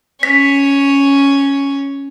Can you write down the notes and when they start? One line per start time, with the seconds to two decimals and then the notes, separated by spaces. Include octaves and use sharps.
0.23 C#4 C#5 B6